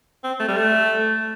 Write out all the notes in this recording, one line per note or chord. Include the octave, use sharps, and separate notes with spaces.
C4
A3
G3
A3